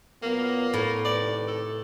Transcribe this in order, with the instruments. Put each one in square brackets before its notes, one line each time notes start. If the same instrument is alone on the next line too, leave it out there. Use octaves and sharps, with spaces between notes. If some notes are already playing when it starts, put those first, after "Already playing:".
[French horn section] A#2 F#3 B3 [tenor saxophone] A#3
[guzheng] A2
[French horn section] C3 D#3 B4 [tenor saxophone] D5
[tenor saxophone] A4